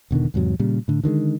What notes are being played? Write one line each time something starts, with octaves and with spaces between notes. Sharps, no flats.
E1 B2 D3 D#3
E2 G#2 C3 F#3
A#2 C#3 G3
A2 D3
D3 D#3 F#3 G#3